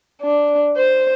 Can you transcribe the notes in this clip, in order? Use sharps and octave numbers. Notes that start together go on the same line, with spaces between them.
D4
C5